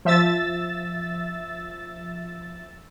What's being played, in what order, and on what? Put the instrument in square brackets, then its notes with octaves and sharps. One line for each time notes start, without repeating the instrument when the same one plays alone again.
[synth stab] F3 E5 E6 A6